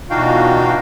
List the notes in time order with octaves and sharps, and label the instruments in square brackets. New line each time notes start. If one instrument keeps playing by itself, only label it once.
[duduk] B2 [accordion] E3 D4 F#4 [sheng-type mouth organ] D#4 F5 G5 [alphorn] F4